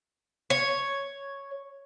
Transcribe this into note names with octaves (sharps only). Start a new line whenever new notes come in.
C#5